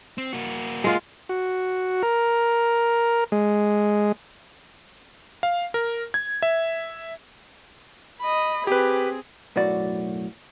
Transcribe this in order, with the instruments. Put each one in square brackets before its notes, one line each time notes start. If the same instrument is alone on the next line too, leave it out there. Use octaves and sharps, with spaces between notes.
[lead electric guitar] C4
A#3 F#4
[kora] G#3 F4
[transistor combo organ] F#4
A#4
G#3
[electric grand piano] F5
A#4
G#6
E5
[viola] D#5 B5
[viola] C4 G#4 [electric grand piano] G4 B4
[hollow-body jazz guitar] B1 F#2 A2 F#4 D5